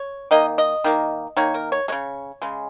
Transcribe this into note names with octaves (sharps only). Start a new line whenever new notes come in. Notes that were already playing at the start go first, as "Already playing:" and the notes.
Already playing: C#5
D#3 A#3 D#5
D#5
D#3 A#3
D#3 A#3 C#5
A#4
C#5
C#3 G#3 C#5
C#3 G#3